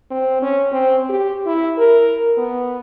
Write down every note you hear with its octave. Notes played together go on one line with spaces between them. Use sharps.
C4
C#4
C4
G4
E4
A#4
B3